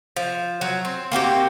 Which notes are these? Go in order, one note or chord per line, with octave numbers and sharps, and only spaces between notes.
F3
F#3
C4
A#3 C4 F#4 G4